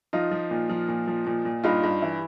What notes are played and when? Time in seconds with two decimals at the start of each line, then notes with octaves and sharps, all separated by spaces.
0.13 F3 D#4 F4
0.31 F3
0.51 A#2
0.69 F3
0.89 A#2
1.07 F3
1.26 A#2
1.45 A#2
1.64 G2 D#4 F4
1.83 G2
2.02 E3